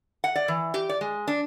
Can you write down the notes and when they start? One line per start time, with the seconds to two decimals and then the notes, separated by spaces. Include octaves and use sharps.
0.24 F#5
0.35 D5
0.48 E3
0.74 G4
0.89 D5
1.01 G#3
1.27 D4